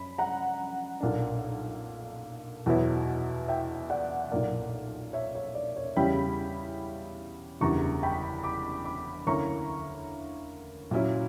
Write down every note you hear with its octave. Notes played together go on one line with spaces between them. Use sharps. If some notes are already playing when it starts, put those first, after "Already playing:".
Already playing: F#2 B5
F#5 A#5
B1 A#2 A#3 D4
E2 B2 F#3 B3 E4
E5 G5
D5 F#5
B1 A#2 A#3 D5
C#5 E5
C#5
D5
C#5
E2 C#3 G3 C#4 E4 G5 B5
F#1 E2 D3 G3 A#5 C#6
G5 B5
B5 D6
B5 D6
D2 D3 A#3 C#4 E4 A#5 C#6
A#2 F#3 C#4 E4